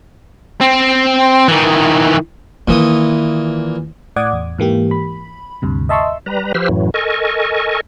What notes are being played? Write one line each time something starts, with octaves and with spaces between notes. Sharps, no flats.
C4
D#3 E3
A#2 D#3 E3 A#3 D#6
A2 D5 F#5 D6 D#6 G#6
E2
G#2 E3 A#3 G4
B5
D2 G2 C3
D#5 E5 A5 C6 C#6 E6
G3 B4 A#5
F3 G4 B4 C5 E6 F6
F#2 A2 E3 F#3
A4 A#4 D#5 G#5 C#6